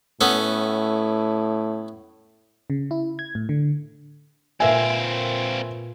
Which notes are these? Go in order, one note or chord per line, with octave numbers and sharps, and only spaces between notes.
A2 B3 C#4 A4
C#3
E4
G#6
A2
D3
A#2 A#3 C4 B4 E5 G#5